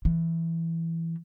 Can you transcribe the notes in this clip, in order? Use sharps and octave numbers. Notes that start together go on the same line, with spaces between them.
E3